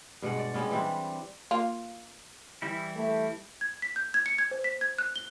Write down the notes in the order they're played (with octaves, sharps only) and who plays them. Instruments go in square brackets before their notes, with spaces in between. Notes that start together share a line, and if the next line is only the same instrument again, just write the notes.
[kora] G2 B2 G#3 F#5
D5
G3 G#3 B3 C#4
E3 G3 C4 D4
[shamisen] A#3 F4
[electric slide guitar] E3 G3 E4
[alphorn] A3
[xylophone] G#6
B6
G6
G#6
C#7
G#6
C5
B6
G#6
F#6
G7